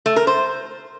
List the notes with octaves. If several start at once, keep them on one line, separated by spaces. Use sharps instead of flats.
A3
A#4
C5